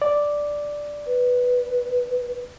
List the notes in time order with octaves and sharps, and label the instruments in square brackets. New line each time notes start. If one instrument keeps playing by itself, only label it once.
[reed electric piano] D5
[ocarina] B4